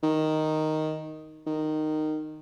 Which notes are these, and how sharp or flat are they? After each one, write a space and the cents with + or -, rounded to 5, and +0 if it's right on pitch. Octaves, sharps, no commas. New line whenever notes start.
D#3 +0
D#3 -10